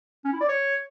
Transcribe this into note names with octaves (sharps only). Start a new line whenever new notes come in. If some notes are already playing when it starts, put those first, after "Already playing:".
C#4
E4
D5
C#5